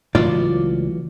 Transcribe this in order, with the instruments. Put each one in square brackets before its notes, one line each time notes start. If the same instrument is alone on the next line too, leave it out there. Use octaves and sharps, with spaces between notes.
[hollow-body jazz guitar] C#2 F4 D5 [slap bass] A2 E3 F#3